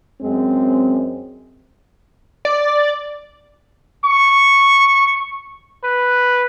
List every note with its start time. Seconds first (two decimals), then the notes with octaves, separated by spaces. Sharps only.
0.22 F#2 G#3 C4
2.45 D5
4.05 C#6
5.84 B4